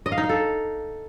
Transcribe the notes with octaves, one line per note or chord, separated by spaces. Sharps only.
D#5
F5
D#4
F5
A4